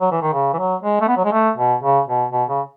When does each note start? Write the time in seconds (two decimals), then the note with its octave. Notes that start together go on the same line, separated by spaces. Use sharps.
0.01 F#3
0.11 E3
0.22 D#3
0.33 C#3
0.54 E3
0.58 F#3
0.83 G#3
1.01 A3
1.08 B3
1.17 F#3
1.25 G#3
1.33 A3
1.57 B2
1.83 C#3
2.08 B2
2.32 B2
2.49 C#3